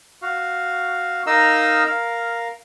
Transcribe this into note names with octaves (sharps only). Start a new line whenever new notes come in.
F#4 F5
D#4 A#4 D#5 F5 A#5 E6
A#4 F5